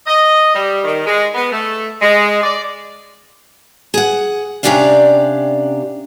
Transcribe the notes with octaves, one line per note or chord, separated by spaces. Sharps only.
D#5
G3
D#3
G#3
B3
A3
G#3
D5
G#4 F#5
C3 C#4 D4 G4 D5 F5